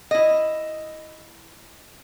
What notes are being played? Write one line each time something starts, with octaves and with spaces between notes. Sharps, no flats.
E4 D#5